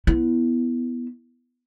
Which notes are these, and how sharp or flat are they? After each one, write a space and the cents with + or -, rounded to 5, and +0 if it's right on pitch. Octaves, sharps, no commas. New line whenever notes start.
B3 +0 E4 +5